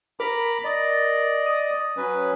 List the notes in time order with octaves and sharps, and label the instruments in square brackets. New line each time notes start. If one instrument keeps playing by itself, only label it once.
[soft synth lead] A#4 [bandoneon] A#5 B5 D6
[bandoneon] D5 D#5
[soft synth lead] D#6
[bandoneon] F#3 C#4 B4